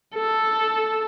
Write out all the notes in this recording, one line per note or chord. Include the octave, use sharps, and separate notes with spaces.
A4